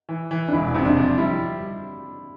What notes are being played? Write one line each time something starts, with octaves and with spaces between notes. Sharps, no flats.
E3
E3
D4
E1 E4
C3 C4
D4
F3
G3 E4